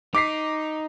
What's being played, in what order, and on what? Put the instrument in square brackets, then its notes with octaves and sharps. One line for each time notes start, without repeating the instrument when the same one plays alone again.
[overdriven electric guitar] D#4 [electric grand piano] D6 B6 C7